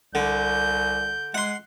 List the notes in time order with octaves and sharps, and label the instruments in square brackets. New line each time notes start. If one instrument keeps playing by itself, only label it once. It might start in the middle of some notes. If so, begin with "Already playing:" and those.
[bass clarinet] C2 [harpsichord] D3 [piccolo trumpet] G6
[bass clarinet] G#3 [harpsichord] F#5 C6